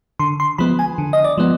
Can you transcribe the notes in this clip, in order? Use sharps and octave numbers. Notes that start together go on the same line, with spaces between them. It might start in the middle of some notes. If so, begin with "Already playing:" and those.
D3 C6
C6
F3 G#3 B3 B5
G#5
D3
D#5
D5
F3 G#3 B3